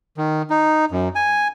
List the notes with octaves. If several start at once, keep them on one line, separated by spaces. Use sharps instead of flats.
D#3
D#4
F#2
G#5